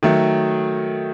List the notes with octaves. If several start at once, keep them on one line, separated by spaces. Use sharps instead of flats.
D#3 F#3 A3